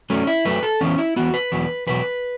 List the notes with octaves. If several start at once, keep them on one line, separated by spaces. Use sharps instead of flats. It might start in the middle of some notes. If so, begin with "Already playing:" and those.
F#2 F#3 A3 C#4
E4
F#2 F#3 A3 B4
A4
E2 E3 B3 C#4
E4
E2 E3 B3 F#4
B4
E2 B2 F#3
E2 B2 F#3 B4